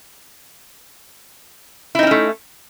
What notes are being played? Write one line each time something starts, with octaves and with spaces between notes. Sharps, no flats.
A3 C4 C#4 D#4 E4